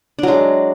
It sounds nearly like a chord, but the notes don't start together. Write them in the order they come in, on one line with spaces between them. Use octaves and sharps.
D4 F#3 G#3